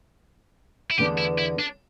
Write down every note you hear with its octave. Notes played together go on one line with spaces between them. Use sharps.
E4
E2 D3 B3 D4 G4
E4
E4
D4